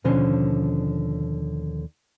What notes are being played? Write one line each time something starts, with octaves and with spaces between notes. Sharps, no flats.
D#2 B2 D3 F3 C#4 C5